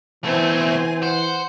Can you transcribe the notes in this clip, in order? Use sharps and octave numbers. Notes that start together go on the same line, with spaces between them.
B2 E3 A3 C4 G#5
C5 F#5